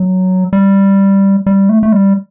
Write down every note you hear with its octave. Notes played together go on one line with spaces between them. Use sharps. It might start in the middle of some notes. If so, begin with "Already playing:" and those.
Already playing: F#3
G3
G3
A3
A3
G3